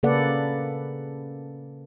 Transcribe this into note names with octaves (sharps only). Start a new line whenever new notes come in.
C#3 A#3 A4 B4 D5 F#5